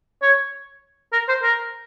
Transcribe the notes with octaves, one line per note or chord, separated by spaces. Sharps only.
C#5
A#4
C5
A#4